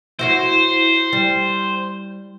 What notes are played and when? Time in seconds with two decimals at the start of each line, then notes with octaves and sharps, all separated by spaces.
0.19 E4 F#4 C5 C#5
1.13 G3